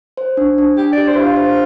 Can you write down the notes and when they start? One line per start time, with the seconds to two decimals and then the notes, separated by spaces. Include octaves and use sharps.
0.17 C5
0.37 D4
0.58 D4
0.77 D4 G4
0.93 D5
0.98 G4
1.08 C5
1.17 D4 E4
1.22 F4
1.37 C5